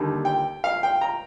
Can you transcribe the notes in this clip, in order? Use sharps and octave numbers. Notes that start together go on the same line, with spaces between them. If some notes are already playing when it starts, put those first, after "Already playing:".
Already playing: D#2 D3 G3
G5
F5
G5
A#5